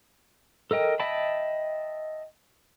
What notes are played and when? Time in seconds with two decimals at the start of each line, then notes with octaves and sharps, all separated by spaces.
0.71 A4 A#4 D#5 G5
1.00 D#5 E5 G5 A5 B5